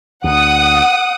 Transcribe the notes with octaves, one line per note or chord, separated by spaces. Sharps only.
D2 F#5 D#6